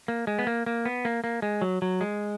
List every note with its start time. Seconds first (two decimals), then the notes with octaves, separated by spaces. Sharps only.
0.08 A#3
0.27 G#3
0.39 B3
0.47 A#3
0.66 A#3
0.85 B3
1.05 A#3
1.24 A#3
1.42 G#3
1.61 F#3
1.82 F#3
2.01 G#3